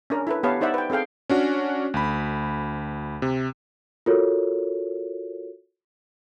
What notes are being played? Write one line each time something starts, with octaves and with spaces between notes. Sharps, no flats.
C#4 D4 A#4
E4 A4 B4
B3 G4 B4 C#5 F5 A5
D#4 C5 D5 E5 F#5
B4 G5
C4 G#4 A4 F5 G5
C#4 D4 F#4
D2 B5
C3
F4 F#4 A4 A#4 C#5